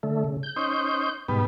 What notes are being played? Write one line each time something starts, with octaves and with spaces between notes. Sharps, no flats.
D3 A3
C#3
G6
C#4 D#4 C5
G#2 B2 G3 B3